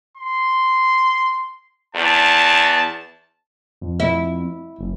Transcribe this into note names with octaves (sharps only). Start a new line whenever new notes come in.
C6
E2 A5
F2
E4
F#1